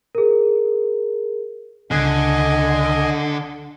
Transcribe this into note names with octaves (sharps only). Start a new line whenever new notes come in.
G#4 A#4
C#2 D3 D#5 G#5